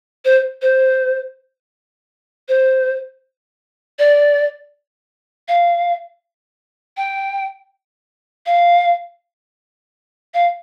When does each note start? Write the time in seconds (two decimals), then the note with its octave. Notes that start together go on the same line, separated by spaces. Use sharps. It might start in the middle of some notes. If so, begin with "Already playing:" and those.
0.25 C5
0.62 C5
2.48 C5
3.99 D5
5.48 F5
6.97 G5
8.46 F5
10.34 F5